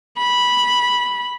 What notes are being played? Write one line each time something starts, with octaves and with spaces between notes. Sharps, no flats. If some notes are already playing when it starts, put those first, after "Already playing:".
B5